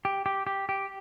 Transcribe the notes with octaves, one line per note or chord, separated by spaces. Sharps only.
G4
G4
G4
G4